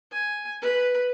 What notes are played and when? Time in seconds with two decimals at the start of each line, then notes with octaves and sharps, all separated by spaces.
0.12 G#5
0.62 B4